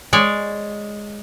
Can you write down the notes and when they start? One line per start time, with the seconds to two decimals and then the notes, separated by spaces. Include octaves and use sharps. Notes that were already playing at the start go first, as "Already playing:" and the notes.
0.13 G#3 C#5 D5